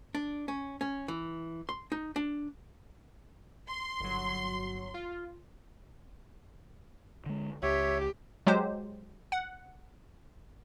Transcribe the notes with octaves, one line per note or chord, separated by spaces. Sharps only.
D4
C#4
C#4
E3
C6
D#4
D4
C6
G1 F#3
F4
D3 G#3
C#2 G4 C#5 E5
F#3 G#3 G4 C5
F#5